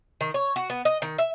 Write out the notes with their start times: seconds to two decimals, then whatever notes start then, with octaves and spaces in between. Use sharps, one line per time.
0.21 D#3
0.34 C#5
0.56 F#4
0.70 B3
0.85 D#5
1.02 D#3
1.18 E5